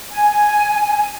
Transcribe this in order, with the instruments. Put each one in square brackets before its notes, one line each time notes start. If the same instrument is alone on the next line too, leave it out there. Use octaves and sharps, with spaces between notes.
[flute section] G#5